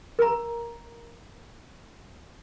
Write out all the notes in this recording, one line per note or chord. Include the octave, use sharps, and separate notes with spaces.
A#4 A#5